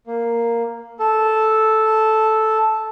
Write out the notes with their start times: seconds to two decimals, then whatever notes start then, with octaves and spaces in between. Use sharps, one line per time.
0.07 A#3
0.99 A4